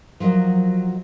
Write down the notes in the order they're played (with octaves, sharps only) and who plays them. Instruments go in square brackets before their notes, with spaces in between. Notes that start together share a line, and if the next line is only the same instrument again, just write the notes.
[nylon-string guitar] F3 F#3 F#4 A#4 D#5